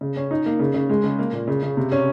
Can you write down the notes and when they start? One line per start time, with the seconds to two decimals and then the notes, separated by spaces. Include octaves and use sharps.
0.01 C#3
0.16 C#4
0.31 D#4
0.46 A#3
0.59 C#3
0.74 C#3
0.89 G#3
1.04 C#3
1.19 A#3
1.33 A#2
1.48 C#3
1.63 C#3
1.77 C3
1.92 C#4